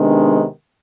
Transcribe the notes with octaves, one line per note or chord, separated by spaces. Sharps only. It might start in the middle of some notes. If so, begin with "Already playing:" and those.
Already playing: C3 D#3 G#3 B3 D4